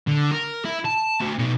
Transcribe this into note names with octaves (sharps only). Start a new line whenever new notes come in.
D3
A#4
E4
A5
A3 F#4
B2 D#4